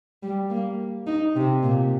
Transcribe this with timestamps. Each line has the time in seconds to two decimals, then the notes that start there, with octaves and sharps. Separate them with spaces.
0.23 G3
0.50 A#3
1.07 D#4
1.36 C3
1.63 A#2